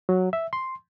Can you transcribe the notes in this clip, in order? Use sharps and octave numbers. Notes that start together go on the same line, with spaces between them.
F#3
E5
C6